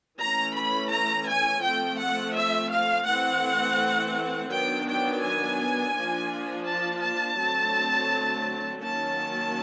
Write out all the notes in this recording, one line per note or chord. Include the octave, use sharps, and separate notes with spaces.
E3 A3 C#4 A#5
B5
A#5
G#5
F3 A3 C4 G5
F#5
E5
F5
E3 A3 C4 F#5
D#3 F#3 B3 D4 G5
G5
G#5
F3 A#3 D4
A5
A5
D3 F#3 A3 C4
D#3 F#3 A#3 C#4 A5